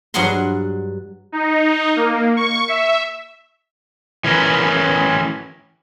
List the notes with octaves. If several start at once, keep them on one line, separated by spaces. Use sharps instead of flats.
G2 F#3 D4 G#4 F#5 C6
D#4
A#3
C#6
E5
E3 C#4 A#4